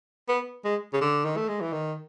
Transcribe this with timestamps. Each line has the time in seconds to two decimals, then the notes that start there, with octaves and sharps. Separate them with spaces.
0.28 B3
0.65 G#3
0.93 C#3
1.01 D3
1.25 D#3
1.37 A3
1.48 G#3
1.61 E3
1.72 D#3